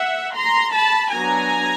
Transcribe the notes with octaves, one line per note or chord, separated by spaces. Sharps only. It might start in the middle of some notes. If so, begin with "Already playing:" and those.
Already playing: E5 F#5
A#5 C6
A5 B5
F#3 B3 D4 G#5 A#5